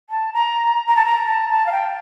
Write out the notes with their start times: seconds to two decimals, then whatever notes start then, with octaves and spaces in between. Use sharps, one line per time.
0.10 A5
0.33 A#5
0.88 A#5
0.96 A5
1.06 A#5
1.26 A5
1.49 A5
1.67 F5
1.72 G5